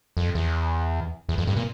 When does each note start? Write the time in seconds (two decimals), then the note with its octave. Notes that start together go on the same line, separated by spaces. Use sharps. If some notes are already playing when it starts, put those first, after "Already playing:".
0.17 F2
0.35 E2
1.29 E2
1.38 F2
1.47 G2
1.57 A#2